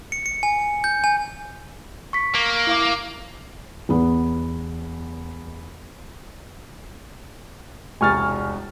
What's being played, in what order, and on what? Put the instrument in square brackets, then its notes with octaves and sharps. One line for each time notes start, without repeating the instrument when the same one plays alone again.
[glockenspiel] C#7
C#7
G#5
G6
G#5
[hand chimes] C#6 B6
[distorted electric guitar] A#3
[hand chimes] E4 F5 D6
[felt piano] E2 B3
[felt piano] E1 C2 A6 [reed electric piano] G#5 C#6 F6